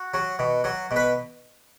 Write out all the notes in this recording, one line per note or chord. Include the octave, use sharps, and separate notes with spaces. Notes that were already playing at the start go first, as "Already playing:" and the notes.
Already playing: F#4
F#3
B2
F#3
B2
B4